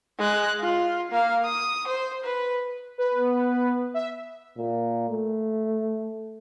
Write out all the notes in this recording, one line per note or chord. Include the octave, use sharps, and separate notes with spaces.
G#3 F#6
F4
A#3 F5
D#6
C5
B4
B4
B3
E5
A#2
A3